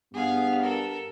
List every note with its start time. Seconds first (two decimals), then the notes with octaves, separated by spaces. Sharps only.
0.13 G2 B3 G#4 F5
0.62 A4 A#4